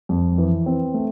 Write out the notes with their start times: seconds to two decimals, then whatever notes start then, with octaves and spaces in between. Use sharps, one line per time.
0.09 F2
0.38 E3
0.66 C4
0.94 A3